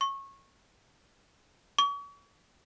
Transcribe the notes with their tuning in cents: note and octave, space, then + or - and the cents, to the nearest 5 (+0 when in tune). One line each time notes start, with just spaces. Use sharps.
C#6 -20
C#6 +40